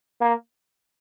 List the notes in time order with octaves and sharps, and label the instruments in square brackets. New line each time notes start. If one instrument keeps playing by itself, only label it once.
[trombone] A#3